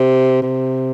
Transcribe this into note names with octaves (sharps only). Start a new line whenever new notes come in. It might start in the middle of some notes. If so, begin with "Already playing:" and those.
Already playing: C3
C3